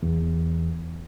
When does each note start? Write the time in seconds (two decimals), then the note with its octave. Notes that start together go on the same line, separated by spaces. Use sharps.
0.03 E2